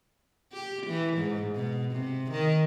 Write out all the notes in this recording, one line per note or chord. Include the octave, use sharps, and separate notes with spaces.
G4
E3
G#2
B2
C3
D#3